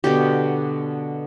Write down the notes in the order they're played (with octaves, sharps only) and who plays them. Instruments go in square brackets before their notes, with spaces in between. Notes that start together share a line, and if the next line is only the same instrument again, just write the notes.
[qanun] B2 D3 G4